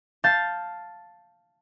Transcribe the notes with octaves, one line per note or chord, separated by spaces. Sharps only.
F5 A5 G6 A6